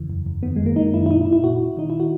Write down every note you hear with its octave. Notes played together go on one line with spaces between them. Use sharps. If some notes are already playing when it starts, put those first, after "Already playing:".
Already playing: E2 C#3 E3
F#2
F#2
D#3 B3
F#2 G#3
A#3
D#3 D#4
F#2 E4
E4
A#2 D#4
E4
A#2
E4
A#2 F#4
A#2
D#3 D#4
E4
F#4